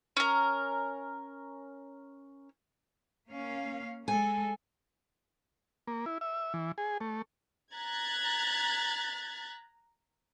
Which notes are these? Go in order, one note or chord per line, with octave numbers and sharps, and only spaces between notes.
C#4 A#4
A#3 C#4 F5
G#3 A4 G#5
A#3
E4
E5
E3
G#4
A3
A#5 F#6 G#6 A6 B6